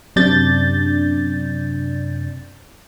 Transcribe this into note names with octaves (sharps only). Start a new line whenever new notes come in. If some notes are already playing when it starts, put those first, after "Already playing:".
F#2 C3 D4 D5 G6 A6